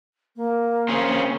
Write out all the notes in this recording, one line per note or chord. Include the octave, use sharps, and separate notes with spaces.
A#3
C4 C#4 G#4